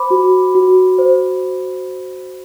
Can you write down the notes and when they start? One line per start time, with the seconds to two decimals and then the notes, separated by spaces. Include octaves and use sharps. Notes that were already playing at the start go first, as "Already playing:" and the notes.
Already playing: C5 B5 D6
0.10 F#4
0.55 F#4
0.98 C5